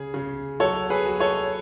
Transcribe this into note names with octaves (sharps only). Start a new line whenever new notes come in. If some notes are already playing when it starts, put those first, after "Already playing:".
Already playing: C#3 G#4
C#3
F#3 A4 C#5
G#4 B4
F#3
A4 C#5